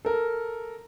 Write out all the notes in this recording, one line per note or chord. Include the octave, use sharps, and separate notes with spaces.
A4 A#4